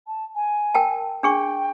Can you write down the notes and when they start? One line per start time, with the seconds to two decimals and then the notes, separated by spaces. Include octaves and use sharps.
0.07 A5
0.35 G#5
0.74 A#4 G5 A5
1.23 D4 G#4 G5 C#6